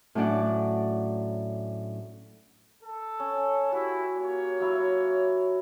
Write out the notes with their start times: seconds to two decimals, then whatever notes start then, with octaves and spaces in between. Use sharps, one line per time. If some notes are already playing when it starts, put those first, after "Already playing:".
0.15 A2 F#3 C#4 D4 D5 F#5
2.83 A4
3.20 C#4
3.73 E4 F#4 G4
4.15 A#3 C#5
4.60 F#3 E4 F#4